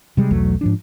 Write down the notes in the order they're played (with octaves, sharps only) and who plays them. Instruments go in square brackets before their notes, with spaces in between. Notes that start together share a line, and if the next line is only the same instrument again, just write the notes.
[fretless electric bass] C3 G3 G#3
B1 E2 F#3 A3
G#2 F3 D4